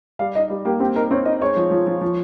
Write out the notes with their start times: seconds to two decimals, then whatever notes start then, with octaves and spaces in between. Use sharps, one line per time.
0.19 G3 F5
0.35 D#4 D#5
0.50 G3
0.65 A#3 G4
0.80 C4 G4
0.96 D#4 A#4
1.11 C4 C#5
1.25 D#4 D#5
1.42 G#3 C#5
1.56 F3
1.71 F3
1.87 F3
2.01 F3